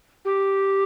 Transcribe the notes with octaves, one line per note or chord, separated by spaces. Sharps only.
G4